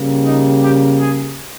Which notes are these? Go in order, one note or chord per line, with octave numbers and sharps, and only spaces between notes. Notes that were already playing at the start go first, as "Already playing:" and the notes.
Already playing: C#3 G3 A#3
D#4
G4
G#4